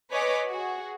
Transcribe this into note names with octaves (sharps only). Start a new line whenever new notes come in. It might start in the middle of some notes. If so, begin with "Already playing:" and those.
B4 C#5 D#5 G#5 D6 B6
F#4 G#4